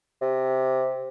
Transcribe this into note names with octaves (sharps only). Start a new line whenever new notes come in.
C3